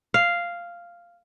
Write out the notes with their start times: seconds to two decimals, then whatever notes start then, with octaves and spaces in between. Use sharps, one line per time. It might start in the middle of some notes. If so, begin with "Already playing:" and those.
0.14 F5